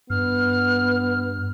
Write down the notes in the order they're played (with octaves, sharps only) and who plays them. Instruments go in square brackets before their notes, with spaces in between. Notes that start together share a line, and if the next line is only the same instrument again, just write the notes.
[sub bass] G2 [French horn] B3 [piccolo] F6